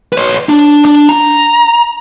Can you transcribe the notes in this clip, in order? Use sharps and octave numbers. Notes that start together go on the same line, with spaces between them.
B4 C#5
D4
D4
A#5